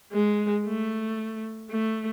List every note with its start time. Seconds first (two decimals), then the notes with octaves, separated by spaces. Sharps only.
0.13 G#3
0.66 A3
1.70 A3